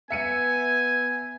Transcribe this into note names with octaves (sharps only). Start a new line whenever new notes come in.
B3 E5 G#5 C#7 D#7